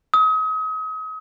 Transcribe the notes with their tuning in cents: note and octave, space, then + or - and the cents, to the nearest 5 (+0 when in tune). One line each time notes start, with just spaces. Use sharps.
D#6 +35